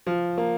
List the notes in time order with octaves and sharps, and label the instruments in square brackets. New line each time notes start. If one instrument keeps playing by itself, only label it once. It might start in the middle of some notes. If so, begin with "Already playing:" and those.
[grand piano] F3
A#3